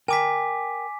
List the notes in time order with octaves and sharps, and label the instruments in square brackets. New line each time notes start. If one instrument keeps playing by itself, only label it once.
[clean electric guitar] A#4 G5 [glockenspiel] G#5 D6 B6